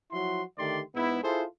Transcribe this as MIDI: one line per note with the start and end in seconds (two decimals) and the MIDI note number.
0.12 0.42 53
0.12 0.42 54
0.12 0.42 64
0.12 0.42 66
0.12 0.42 84
0.58 0.81 50
0.58 0.81 51
0.58 0.81 57
0.58 0.81 67
0.58 0.81 74
0.58 0.81 84
0.95 1.21 44
0.95 1.21 59
0.95 1.21 64
1.23 1.43 64
1.23 1.43 65
1.23 1.43 68
1.23 1.43 69
1.23 1.43 72